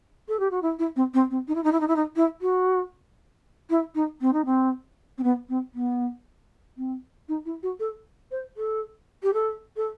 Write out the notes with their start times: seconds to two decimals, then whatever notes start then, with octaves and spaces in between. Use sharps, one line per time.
0.29 A4
0.40 G4
0.51 F#4
0.62 E4
0.79 E4
0.96 C4
1.14 C4
1.31 C4
1.48 D#4
1.55 E4
1.64 D#4
1.72 E4
1.80 D#4
1.88 E4
1.96 D#4
2.16 E4
2.42 F#4
3.70 E4
3.95 D#4
4.21 C4
4.33 D#4
4.45 C4
5.18 C4
5.23 B3
5.49 C4
5.74 B3
6.77 C4
7.29 D#4
7.46 E4
7.63 F#4
7.80 A4
8.31 C5
8.57 A4
9.23 G4
9.34 A4
9.77 A4